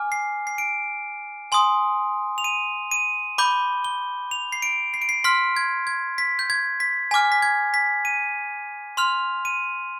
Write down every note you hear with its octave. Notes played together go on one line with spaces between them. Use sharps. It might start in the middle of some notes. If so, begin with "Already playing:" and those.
Already playing: G#5 D6 F6
C7
C7
D7
G#5 C6 D#6
F7
D#7
D#7
B5 D6 G6 G7
G7
F7
C7
D7
C7
D7
C7
C6 F6 B6
G#6
G#6
B6
G6
G#6
B6
G#5 D6 F6 B6
B6
G#6
B6
D#7
C6 F6 F7
D#7